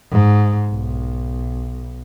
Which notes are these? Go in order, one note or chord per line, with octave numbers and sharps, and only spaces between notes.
G#2
B1